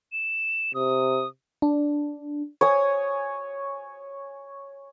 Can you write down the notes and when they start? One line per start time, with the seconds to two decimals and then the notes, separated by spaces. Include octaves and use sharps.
0.12 E7
0.75 C3 D#6
1.62 D4
2.61 C#5 G#5 D#6